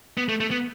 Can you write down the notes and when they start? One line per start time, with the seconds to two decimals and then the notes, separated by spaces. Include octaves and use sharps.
0.17 B3
0.29 A3
0.40 A3
0.51 B3